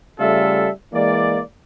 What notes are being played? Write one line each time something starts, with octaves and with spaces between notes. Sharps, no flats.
C#3 G3 A3 F4 A4 E5
E3 G#3 A#3 D5